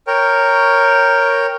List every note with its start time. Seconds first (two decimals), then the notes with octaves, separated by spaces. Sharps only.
0.07 A#4 C#5 G5